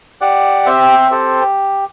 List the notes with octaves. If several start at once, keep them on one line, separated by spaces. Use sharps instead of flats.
G4 D5 F#5
C4 C5 E5
G4 A4 C5